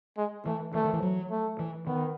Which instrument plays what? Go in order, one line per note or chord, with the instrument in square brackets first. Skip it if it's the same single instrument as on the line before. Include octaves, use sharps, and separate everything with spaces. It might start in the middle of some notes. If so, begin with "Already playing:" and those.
[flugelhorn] G#3
[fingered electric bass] E3 [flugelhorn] A3
[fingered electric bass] E3 [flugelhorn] A3
[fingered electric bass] D#3
E3
F#3
[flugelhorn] A3
[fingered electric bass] E3
[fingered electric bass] D#3 [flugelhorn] B3